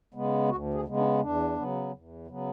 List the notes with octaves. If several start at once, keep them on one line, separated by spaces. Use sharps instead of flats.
C#3 G#3 B3
D2 F#4
G#4
C#3 G#3 B3
D4
E2 D4
C#3 F#3 B3
E2
C#3 F#3 B3